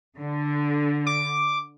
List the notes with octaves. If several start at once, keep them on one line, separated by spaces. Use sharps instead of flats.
D3
D6